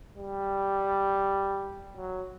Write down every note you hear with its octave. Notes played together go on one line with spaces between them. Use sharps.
G3
F#3